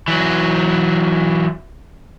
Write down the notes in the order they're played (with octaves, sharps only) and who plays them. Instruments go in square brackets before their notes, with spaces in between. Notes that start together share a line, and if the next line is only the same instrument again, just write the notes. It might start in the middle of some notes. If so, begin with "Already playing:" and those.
[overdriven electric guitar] E3 F#3